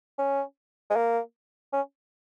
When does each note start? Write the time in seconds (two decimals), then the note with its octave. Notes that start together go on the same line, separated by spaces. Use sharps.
0.18 C#4
0.90 G#3
0.96 A#3
1.73 C#4